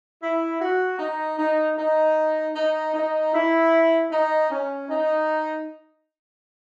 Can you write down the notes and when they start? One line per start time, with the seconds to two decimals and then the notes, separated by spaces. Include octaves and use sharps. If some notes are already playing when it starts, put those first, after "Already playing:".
0.22 E4
0.60 F#4
0.99 D#4
1.39 D#4
1.77 D#4
2.55 D#4
2.94 D#4
3.33 E4
4.11 D#4
4.50 C#4
4.89 D#4